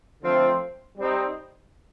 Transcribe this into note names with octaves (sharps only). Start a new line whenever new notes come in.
D3 F3 A3 C4 F4
G3 C4 D#4